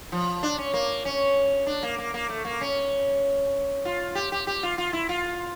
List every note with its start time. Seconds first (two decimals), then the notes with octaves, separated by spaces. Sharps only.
0.12 F3
0.43 D4
0.58 C#4
0.74 A#3
1.05 C#4
1.67 D4
1.83 A#3
1.98 A#3
2.14 A#3
2.29 A3
2.45 A#3
2.61 C#4
3.85 F4
4.15 G4
4.32 G4
4.47 G4
4.63 F4
4.78 F4
4.93 E4
5.09 F4